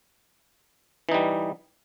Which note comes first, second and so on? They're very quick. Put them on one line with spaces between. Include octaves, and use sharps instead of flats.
E3 D#4 G3